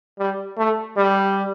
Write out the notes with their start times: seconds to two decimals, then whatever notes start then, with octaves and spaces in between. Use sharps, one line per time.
0.19 G3
0.57 A3
0.97 G3